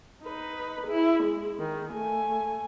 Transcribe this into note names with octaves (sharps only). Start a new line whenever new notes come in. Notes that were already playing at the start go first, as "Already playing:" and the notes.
D#4 B4
E4 G#4
G#3
D#3
A3 G#5